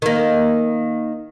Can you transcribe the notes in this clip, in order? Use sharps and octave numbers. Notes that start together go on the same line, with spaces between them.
D#3 A#3